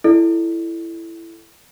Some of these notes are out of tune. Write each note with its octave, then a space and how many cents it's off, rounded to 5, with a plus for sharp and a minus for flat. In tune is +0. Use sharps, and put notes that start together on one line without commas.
E4 +15 A4 +0 D5 +35